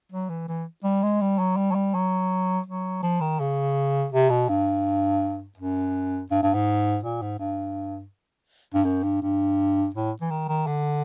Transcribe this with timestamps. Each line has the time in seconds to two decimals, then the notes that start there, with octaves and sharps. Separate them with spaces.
0.12 F#3
0.29 E3
0.48 E3
0.84 G3
1.03 G#3
1.21 G3
1.38 F#3
1.57 G3
1.71 F#3
1.75 G3
1.94 F#3
2.66 F#3
3.03 F3
3.21 D#3
3.40 C#3
4.12 C3
4.30 B2
4.49 G2
5.58 F#2
6.31 G2
6.43 G2
6.54 G#2
7.04 A#2
7.22 G#2
7.39 G2
8.74 G2
8.85 F#2
9.03 G2
9.22 G2
9.95 A2
10.21 E3
10.31 D#3
10.48 D#3
10.67 D3